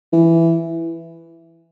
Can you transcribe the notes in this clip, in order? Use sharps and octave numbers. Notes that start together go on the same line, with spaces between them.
E3